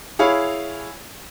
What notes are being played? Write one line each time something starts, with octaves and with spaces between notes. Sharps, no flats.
E4 G#4 C#5 F5